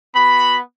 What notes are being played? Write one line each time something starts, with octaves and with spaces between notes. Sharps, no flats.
B3 F#4 B5